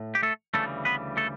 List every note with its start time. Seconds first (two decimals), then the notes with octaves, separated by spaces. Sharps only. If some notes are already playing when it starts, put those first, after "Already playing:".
Already playing: A2
0.15 G4
0.23 A3 A4
0.54 D2 C#3 E3 G3 A3 A4
0.85 B3 B4
1.17 A3 A4